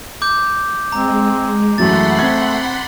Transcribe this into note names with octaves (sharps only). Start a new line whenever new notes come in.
D6 G6
G#3 C4 A#5
F#2 E3 F#3 A3 F#5 B5 C6 A6
C4 G#6